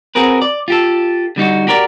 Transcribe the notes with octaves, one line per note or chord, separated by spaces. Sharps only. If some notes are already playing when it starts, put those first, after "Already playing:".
C4 F#4 G#4 A#4 B4
D5
F4 G4 A4
D3 G3 D#4 F#4
F#4 G4 A#4 B4 D5